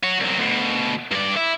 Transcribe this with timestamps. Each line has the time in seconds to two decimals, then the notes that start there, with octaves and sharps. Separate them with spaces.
0.03 F#4 C#5
0.20 C2 F#3
0.39 D2 B2
1.11 G2 D5
1.36 E4